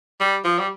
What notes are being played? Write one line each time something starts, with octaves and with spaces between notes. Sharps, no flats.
G3
F3
G3